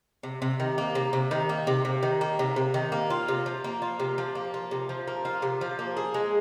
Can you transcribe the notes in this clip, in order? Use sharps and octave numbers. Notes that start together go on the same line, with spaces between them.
C3
C3
D#3
A#3
C3
C3
D#3
A#3
C3
C3
D#3
A#3
C3
C3
D#3
A#3
F4
C3
F3
A#3
F4
C3
F3
A#3
F4
C3
F3
A#3
F4
C3
F3
A#3
G#4
G#3